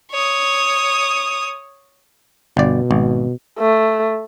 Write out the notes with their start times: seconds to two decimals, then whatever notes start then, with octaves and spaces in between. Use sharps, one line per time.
0.11 C#5 D#6
2.57 G1 B2 D5
2.91 G#1
3.59 A3